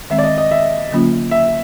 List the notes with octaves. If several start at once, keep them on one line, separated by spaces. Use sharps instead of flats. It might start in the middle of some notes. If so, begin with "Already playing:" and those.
D#3 G#3 C4 E5
D5
D#5
D#5
E5
D3 F#3 A#3 C#4 F4
E5